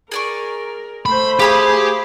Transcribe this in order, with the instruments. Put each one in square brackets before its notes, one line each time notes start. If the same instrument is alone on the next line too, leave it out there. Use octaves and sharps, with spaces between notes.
[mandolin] G#4 D5 C#6 [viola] A#4
[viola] A3 C5 [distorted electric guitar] B5
[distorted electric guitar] G4 [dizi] G#4 [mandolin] F5 B5 D#6